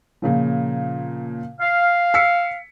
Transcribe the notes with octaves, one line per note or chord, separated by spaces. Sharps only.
A#2 C#3 F3
F5
E6 B6 C#7